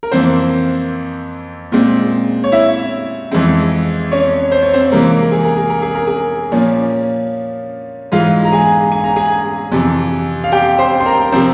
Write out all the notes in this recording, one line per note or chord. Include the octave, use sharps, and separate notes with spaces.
A#4
F2 E3 A#3 C4 C5
A#2 G#3 C4
C#5
E4 E5
F2 E3 G#3 C4
C#4 C#5
C5
C#5
C4 C5
C3 E3 G#3 A#3 A#4
G#4
A#4
G#4
A#4
G#4
A#4
G#4
A#2 F3 A#3 C#4
G#2 E3 G#3 F4 F5
A#5
G#4 G#5
G#5
A#5
G#4 G#5
F2 C3 E3
F5
G4 G5
C5 C6
C6
A#4 A#5
C3 F3 C4 C5